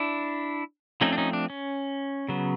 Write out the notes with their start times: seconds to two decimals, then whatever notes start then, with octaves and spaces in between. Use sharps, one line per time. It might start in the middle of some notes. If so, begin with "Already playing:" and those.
Already playing: D4 E4
1.01 F3 A3 C4 C#4 D#4
1.13 D4
1.18 C#4 D#4
1.33 D4
1.50 C#4
2.28 C#3 F#3 B3